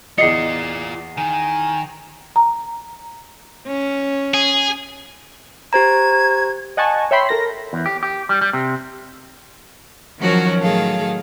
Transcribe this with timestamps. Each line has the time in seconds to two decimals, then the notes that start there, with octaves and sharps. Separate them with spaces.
0.18 E2 F4 D5 D#5 C7 C#7
1.17 D#3 G#5
2.36 A#5
3.66 C#4
4.34 G#4
5.73 G4 C5 A#5 G#6
6.77 D#5 F#5 G#5 A5 C#6
7.11 C#5 E5 G5 B5 C6
7.29 A4 A#4 A#6
7.73 E2
7.86 G4
8.03 G4
8.29 G3
8.41 G3
8.53 C3
10.19 D#3 F3 F#3 C#4 F#4 A#4
10.61 A2 D#3 F#3 G#4 A4 F5